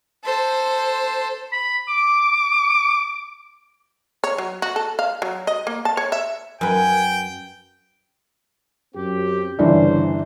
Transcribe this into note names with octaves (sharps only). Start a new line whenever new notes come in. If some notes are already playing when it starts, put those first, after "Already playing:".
A4 C5
B5
D6
C#5
F#3
F#4
A4
F5
F#3
D#5
A#3
A5
C#5
E5
F#2 B4 G5 G#5
F#2 C4 G4
G1 C#3 E3 D4 C5